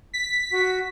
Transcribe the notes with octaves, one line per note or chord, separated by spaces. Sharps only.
B6
F#4